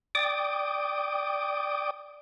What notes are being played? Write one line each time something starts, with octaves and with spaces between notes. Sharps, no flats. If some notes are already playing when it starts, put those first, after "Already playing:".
D5 G5 D6 D#6